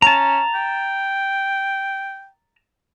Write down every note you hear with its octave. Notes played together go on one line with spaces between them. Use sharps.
C#4 A5 A#5
G5